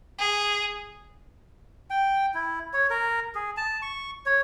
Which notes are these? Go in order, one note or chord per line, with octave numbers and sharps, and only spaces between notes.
G#4
G5
E4
C#5
A#4
G#4
A5
C#6
C#5